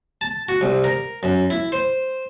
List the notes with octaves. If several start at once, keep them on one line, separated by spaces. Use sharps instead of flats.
A5
F#4
C2
A#4
F#2
E4
C5